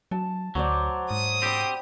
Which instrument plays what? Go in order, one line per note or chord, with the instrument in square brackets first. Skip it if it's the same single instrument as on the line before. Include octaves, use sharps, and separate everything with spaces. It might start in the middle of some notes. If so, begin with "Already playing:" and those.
[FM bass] F#3 [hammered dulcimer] A5
[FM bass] D2 [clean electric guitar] F#3 [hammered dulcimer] F#4 C5 D5
[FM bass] G#2 [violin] D#6
[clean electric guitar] C4 G4 [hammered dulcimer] G5 B5